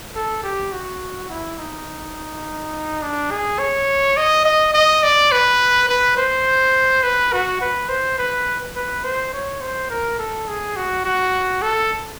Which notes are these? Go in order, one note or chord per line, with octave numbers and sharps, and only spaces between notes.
A4
G4
F#4
E4
D#4
D4
G#4
C#5
D#5
D#5
D#5
D5
B4
B4
C5
B4
F#4
B4
C5
B4
B4
C5
C#5
C5
A#4
A4
G#4
F#4
F#4
A4